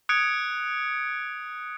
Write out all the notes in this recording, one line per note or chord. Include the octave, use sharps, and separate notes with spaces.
D#6 F#6 G#6 C#7 D7